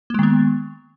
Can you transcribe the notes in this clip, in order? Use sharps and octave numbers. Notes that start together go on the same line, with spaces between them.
D#3 G#3 A#3 B3